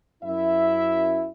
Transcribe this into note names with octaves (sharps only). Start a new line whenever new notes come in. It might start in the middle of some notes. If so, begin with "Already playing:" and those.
F#2 E4 E5